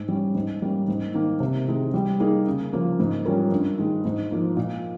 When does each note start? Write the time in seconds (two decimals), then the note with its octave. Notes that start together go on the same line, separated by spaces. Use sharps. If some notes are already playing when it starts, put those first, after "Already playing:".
Already playing: G#2
0.08 G3 C#4
0.35 G#2
0.62 G3 A#3 C#4
0.88 G#2
1.14 D#3 A#3
1.40 C3
1.68 D#3 G#3 D#4 G#4
1.94 G3
2.20 A#3 D#4 G#4
2.47 C#3
2.73 F3 A#3
3.00 G#2
3.25 G3 C#4 F4 A#4
3.52 G2
3.78 D#3 G#3
4.05 G#2
4.31 F3 A#3 D#4
4.57 A#2